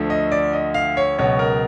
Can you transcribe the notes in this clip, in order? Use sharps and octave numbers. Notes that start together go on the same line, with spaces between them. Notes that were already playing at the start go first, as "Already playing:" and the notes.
Already playing: D2 D3 F3 A3
D#5
D5
D#5
F5
C#5
C#2 B2 F#3 C#5
A#4